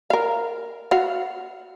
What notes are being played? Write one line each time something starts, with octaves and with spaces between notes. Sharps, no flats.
A#4 F5
F#4 F5